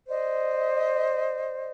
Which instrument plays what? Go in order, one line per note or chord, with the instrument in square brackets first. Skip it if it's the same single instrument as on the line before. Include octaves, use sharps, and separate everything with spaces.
[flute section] C5 D5 D#5